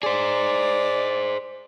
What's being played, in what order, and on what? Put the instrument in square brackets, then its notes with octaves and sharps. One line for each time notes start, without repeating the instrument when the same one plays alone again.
[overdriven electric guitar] G#4 C5 [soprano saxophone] D5